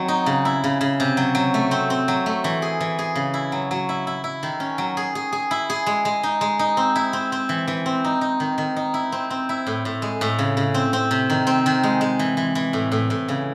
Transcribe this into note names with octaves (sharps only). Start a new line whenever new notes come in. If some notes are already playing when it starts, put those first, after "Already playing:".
Already playing: D#3 F#3 C4
D#4
C#3
E4
C#3
C#3
C3
F#3
F#3
A3
C4
C4
F#3
A3
E3
G#4
E3
G#4
C#3
E4
F#3
F#3
E4
E4
E4
D#3
C#4
F#3
G#4
G#4
G#4
E4
G#4
G#3
G#3
D#4
G#3
D#4
C4
E4
C4
C4
E3
E3
C4
D#4
D#4
D#3
D#3
D#4
E4
C4
C4
E4
A2
A2
G#3
A2
C#3
C#3
C4
C4
C3
D#3
C4
D#3
G#3
G#3
E3
E3
E3
A2
A2
A2
C#3